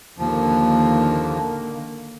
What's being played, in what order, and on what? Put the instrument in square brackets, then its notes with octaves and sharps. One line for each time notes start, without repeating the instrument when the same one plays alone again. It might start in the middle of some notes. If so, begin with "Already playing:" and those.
[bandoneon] D#2 F3 [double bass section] D3 D#3 A#3